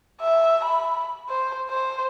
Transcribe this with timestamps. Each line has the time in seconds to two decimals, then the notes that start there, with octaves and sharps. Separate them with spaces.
0.20 E5
0.64 B5
1.29 C5
1.69 C5